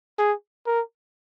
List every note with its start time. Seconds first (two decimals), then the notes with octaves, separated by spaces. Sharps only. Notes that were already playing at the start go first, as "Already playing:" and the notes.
0.19 G#4
0.67 A#4